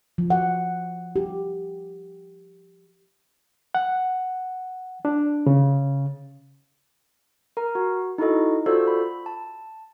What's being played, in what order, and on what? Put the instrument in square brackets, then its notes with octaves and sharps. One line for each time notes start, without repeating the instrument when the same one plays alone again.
[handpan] F3
F#5
G4
[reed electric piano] F#5
D4
C#3
[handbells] A#4 A#5
F#4
D#4 E4 F#4 A4 D#5
F4 F#4 A4 C5 D5 E6
B5
A5